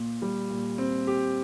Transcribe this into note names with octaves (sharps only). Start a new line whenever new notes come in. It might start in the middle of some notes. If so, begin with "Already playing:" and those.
Already playing: A#2
G3
A#2
C4
G4